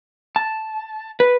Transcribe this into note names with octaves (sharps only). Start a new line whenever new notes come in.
A5
B4